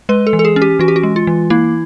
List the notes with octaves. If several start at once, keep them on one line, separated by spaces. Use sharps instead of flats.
G#3 B4
A4
E3
A4
G#4
C#4
G4
E3 F#4
G4
F#4
G#3
F4
E3
A#3 E4